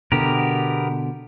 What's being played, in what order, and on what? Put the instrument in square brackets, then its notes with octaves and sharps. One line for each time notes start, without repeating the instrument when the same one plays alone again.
[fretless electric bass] B2 D3 [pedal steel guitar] B3 G4 A#4